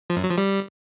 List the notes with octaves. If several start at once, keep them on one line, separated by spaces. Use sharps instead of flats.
F3
F#2
F#3
F3
G3